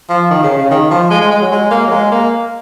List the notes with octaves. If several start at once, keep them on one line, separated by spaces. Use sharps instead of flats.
F3
D#3
C#3
C#3
D#3
F3
G#3
G#3
G#3
F#3
G#3
A#3
F#3
G#3
A#3